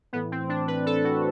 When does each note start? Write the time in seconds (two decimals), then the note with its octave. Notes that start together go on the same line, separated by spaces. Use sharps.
0.13 A2 E3 B3
0.32 C4
0.49 D4
0.68 B4
0.86 A4
1.05 F#4